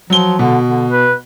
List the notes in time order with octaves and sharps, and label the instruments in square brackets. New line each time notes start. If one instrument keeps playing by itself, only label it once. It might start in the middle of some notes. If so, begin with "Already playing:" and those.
[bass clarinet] F3 [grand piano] F#3 G7
[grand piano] B2 [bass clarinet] D3
[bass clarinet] D3
B4